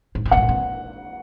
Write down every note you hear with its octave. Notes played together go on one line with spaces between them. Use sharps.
G#2
A2
B2 F#5
A#2
C3